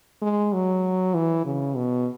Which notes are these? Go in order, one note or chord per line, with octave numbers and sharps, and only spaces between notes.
G#3
F#3
E3
C#3
B2